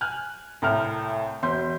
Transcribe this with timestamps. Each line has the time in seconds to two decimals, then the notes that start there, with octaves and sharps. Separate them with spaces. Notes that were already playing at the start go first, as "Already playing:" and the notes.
0.01 G#5 F6 F#6
0.62 C2 A2 A#5 F6
1.43 E1 C6 G6